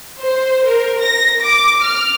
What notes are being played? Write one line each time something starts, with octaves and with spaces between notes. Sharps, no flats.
C5
A#4
A#6
D6
F6